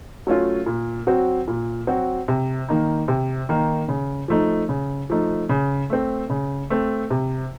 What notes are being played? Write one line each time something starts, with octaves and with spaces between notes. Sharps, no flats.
F#3 A3 C#4 F4
A#2
F#3 C4 F#4
A#2
F#3 C4 F#4
C3
D#3 A#3 D#4
C3
D#3 A#3 D#4
C#3
F3 A3 D#4
C#3
F3 A3 D#4
C#3
A3 C4
C#3
A3 C4
C3